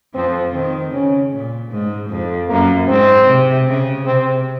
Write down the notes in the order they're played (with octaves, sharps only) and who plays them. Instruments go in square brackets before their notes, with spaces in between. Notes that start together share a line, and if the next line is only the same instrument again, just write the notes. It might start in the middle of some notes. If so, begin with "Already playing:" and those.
[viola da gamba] F2 F3 [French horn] C4
[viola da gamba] D#3 [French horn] C4
[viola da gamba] C#3 [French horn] C#4
[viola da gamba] A#2
G#2
F2
[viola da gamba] F#2 [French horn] A#3
[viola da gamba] G#2 [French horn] C4
[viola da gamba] C3
C#3
[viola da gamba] C3 [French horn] C4